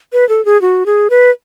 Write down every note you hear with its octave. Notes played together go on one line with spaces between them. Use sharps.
B4
A4
G#4
F#4
G#4
B4